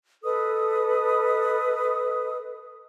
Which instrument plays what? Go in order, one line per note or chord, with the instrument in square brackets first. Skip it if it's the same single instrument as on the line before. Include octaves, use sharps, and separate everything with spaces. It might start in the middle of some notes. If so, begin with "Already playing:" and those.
[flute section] A4 B4 D#5 D#6